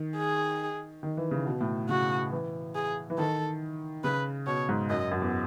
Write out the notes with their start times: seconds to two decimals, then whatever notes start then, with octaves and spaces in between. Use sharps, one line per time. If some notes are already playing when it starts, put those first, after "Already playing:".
Already playing: D#3
0.17 G#4
1.03 D#3
1.17 E3
1.31 C#3
1.46 B2
1.61 A2
1.89 C#3 F#4
2.32 E3
2.75 G#4
3.10 E3
3.18 D#3 A4
4.04 C#3 B4
4.46 B2 C#5
4.69 G#2
4.90 F#2 D#5
5.11 F#2
5.22 E2